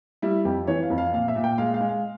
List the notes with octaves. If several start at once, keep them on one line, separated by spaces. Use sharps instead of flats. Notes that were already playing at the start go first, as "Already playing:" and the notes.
G3 E4
F2 G4
E3 C#5
F5
F2
F5
A#2 F5
E5
A#2
G5
G#3 F5
F5
G#3
F5